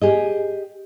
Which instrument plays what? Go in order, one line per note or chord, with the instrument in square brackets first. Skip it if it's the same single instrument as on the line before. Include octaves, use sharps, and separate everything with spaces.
[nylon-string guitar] G4 G#4 D#5